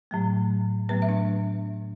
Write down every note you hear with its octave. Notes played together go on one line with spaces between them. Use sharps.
A2 F#3 A3
A2 F#3 A3 B3 B4
E5
D4